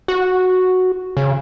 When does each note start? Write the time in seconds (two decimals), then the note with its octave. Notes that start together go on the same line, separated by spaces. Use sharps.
0.08 F#4
1.17 C#3